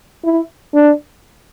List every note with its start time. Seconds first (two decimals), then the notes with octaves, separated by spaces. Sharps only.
0.24 E4
0.74 D4